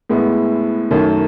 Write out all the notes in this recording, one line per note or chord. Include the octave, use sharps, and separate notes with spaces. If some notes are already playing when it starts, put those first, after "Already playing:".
A2 G#3 B3 E4
F#2 D#3 A3